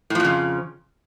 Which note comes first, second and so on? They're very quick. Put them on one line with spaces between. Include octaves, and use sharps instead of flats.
A2 F3 F2 C#3